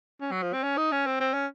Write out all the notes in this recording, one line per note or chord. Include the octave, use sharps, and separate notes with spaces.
C#4
F#3
F3
C4
C#4
D#4
C#4
C4
C4
C#4